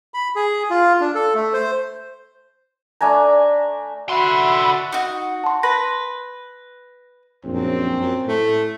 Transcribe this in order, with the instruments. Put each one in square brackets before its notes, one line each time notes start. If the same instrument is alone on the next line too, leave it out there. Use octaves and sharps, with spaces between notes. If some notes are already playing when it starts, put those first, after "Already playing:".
[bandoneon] B5
G#4
F4
D4
A4
A3
C5
[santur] A3 D4 G#5 A#5
[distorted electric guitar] D3 C6 [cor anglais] F#4 [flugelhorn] E5 [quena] B5
[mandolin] D#4 F#4
[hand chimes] A5 C6
[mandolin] B4 [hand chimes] A#6
[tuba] A#1 [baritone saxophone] F#2 [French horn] C4
[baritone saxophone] F#2
[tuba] A2 [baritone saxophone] A3